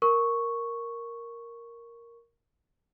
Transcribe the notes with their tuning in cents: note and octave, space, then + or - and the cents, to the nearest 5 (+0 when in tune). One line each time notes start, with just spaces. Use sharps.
A#4 +0 C#6 +0